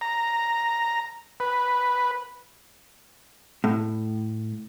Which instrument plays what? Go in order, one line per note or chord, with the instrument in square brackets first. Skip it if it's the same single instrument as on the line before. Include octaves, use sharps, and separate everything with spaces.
[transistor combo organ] A#5
B4
[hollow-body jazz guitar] A2